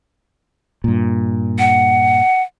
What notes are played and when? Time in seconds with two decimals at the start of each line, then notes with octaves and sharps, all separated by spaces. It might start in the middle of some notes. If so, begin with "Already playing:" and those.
0.84 G2 A#2
1.59 F#5